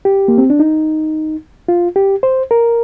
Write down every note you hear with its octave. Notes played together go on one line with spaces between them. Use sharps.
G4
A#3
C4
D4
D#4
F4
G4
C5
A#4